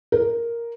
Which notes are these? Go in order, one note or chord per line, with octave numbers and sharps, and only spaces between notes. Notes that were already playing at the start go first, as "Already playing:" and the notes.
A#4